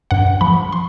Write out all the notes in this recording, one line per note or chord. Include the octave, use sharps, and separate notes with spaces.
G2 F#5
F3 B5
C6